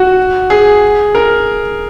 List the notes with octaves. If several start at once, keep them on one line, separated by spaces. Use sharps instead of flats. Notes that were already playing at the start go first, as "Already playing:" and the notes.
Already playing: F#4
G#4
A#4